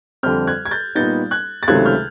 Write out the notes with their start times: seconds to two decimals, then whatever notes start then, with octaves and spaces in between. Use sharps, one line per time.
0.23 F2 D3 G3 C4 F6 G6
0.47 F#6 G#6
0.66 G#6
0.71 G6 A6
0.95 A#2 G3 B3 D#4 G6 A6
1.31 F#6 G#6
1.63 A6
1.67 C#2 C3 D#3 F#3 A3 F#6 G#6
1.85 F6 G6